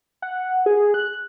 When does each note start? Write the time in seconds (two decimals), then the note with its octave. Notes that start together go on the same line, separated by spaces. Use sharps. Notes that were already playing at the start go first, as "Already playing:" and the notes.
0.22 F#5
0.66 G#4
0.94 F#6